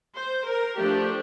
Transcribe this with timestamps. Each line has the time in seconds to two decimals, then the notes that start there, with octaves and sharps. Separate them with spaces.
0.16 C5
0.47 A#4
0.77 F3 A3 D4 G4